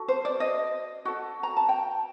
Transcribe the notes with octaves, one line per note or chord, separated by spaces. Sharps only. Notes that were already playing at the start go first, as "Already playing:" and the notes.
Already playing: F#4 A4
C5
D5
D#5
F#4 A4
A#5
A5
G5